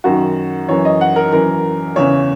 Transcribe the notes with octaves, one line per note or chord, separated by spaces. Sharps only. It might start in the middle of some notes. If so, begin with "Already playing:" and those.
F#2 D#3 F#4
F#2 E3 C#5
D#5
F#5
A#4
F#2 E3 A#4
E2 C#3 E3 C#5